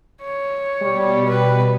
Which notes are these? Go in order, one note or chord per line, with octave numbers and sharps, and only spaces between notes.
C#5
B2 G3
B4